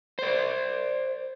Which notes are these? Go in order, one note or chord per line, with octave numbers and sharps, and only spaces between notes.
C5 D5